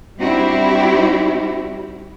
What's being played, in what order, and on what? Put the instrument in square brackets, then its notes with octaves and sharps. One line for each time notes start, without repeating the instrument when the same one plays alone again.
[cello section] G3 C4 D4 E4 F#4 G4